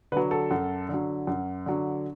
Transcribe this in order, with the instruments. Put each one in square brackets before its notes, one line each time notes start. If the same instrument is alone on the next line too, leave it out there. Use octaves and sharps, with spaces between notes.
[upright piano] D3 B4
F#3
A4
F#2
D3 F#3
F#2
D3 F#3